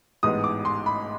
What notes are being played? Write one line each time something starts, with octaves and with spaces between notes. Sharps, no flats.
A1 G#2 E3 G#3 B3 D#6
D6
C6
B5